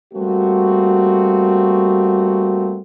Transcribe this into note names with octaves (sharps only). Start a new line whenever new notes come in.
G3 A3 A#3 C4 F#4